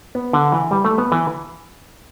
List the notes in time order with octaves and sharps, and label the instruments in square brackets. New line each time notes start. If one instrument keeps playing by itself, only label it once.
[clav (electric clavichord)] B3
D3
E3
G3
A3
B3
E3